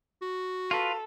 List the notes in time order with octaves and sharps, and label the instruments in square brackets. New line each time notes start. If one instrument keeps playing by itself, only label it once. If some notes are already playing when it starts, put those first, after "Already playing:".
[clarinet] F#4
[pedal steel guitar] F4 B4 [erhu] A4